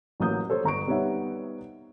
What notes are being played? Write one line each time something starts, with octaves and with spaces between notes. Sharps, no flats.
A1 F#3 A#3 D#6 G6
A4 C5 C#5
G1 A#5 C#6 D7
G3 B3 D#4 C#5 E5 F#5